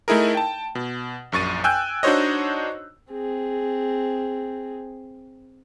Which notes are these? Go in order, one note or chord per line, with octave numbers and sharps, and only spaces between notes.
A3 D#4 E4 G#4 A#4
G5 A5
B2
A#1 F#2 C#6 A6 D#7
G5 G#5 E6 F#6 G6
D4 D#4 F#4 C5 C#5 D#5
C4 G#4